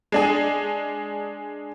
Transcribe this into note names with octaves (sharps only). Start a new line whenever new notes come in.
G#3 D4 G#4